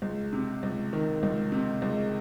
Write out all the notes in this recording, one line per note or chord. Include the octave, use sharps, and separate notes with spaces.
C#2
C3
C#2
D#3
C#2
C3
C#2